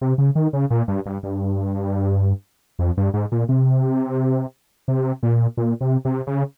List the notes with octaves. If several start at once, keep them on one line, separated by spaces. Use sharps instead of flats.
C3
C#3
D#3
C#3
A#2
G2
G2
G2
F2
G2
G#2
A#2
C3
C3
A#2
A#2
C3
C3
C#3